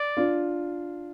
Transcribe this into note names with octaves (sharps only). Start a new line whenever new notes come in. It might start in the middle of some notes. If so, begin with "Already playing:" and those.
Already playing: D5
D4 F4